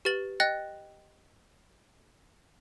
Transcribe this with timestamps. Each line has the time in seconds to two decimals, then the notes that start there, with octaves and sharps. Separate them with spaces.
0.05 G4 B4 A6 F#7
0.40 D#5 G5 F#6 A6 A#6